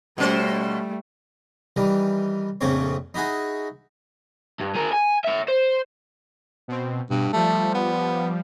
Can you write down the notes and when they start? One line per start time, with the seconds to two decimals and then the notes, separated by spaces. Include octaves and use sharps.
0.18 B2 G3 A3 C#4 C5
1.76 D#3 E3 G3
2.61 A#1 F2 C#3 A3 C4 C#5
3.14 D#4 E4 F#4 G#4
4.60 G2
4.75 G#4 A#4
4.92 G#5
5.24 C#5 E5
5.48 C5
6.68 B2 C4
7.10 G2 B2
7.33 F3 G3 A3
7.74 B3